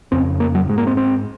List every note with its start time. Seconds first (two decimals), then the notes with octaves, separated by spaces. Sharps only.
0.12 F2 C#3 C4
0.40 A#3
0.55 F#3
0.69 G#2 G#3
0.78 A#3
0.87 C4
0.97 C4